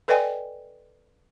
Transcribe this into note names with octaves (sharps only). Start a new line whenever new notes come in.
A4 B4 D5 D#5 G5 G#5